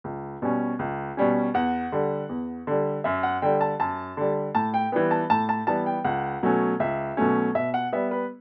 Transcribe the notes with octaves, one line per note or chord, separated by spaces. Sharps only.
C#2
B2 G3 C#4
C#2
B2 G3 C#4
E2 F#5
D3 G3
E2
D3 G3
F#2 E5
F#5
D3 G3 G5
A5
F#2 A5
D3 G3
A2 A5
G5
E3 G3 B3 G5
A5
A2 A5
A5
E3 G3 B3 A5
G5
C#2 F#5
B2 F#3 A3 C#4
C#2 E5
B2 F#3 A3 C#4
B2 E5
F#5
G3 B3 E5
B4